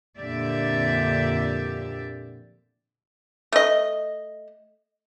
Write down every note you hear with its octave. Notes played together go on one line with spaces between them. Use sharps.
F2 A#2 D3 G4 D5 E5
A3 D#5